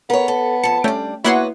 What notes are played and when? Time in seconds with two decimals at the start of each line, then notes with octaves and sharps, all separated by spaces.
0.10 B3 A#4 C#5
0.28 A4
0.64 F2 A5 C#7
0.84 G3 A3 C#4 D4 G5
1.24 A#3 B3 E4 F#4 C#5 F#5 C6